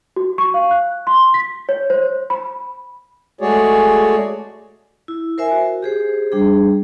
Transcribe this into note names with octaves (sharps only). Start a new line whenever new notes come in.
F#4
C#6
F5
F#6
C6
B6
C#5
C5
B5
G#3 A3 F#4 G#4 C#5 D5
E4
A#4 C5 E5 G#5
F#4
G4 G#4 C5
G3 D4 G#4